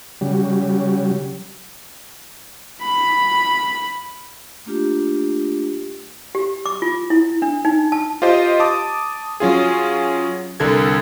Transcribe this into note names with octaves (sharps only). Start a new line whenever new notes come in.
C#3 F#3 G3
B5
A3 A#3 D4 F4 G4
G4
D6
F4
E4
D4
D#4
A5
F4 G4 C5 D#5
A5 D6 D#6
F#3 C#4 F4 G#4
C2 D3 A4 A#4 G#6